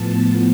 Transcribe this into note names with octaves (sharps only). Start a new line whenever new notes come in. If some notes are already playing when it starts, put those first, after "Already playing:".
Already playing: A2 F3 B3 A5